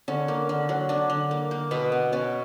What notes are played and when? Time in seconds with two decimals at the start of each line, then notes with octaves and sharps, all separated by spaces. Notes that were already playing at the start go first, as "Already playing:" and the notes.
0.08 D3 C#4
0.28 A#3
0.49 D3
0.69 F#3
0.89 D3 D4
1.10 D3
1.31 A#3
1.51 A#3
1.71 B2 B3
1.92 B3
2.12 B2 C#4